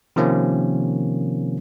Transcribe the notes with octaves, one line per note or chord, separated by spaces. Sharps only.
C3 D#3 F3 A#3 C4 C#4